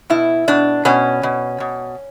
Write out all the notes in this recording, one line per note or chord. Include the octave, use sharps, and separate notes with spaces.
B2 E4
B2 D4
B2 C#4
B2
B2